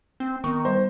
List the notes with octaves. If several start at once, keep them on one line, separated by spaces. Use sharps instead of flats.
C4
D#3 B3 C#6
G3 C5